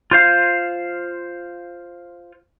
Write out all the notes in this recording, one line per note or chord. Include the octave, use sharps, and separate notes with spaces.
F4 C5 F5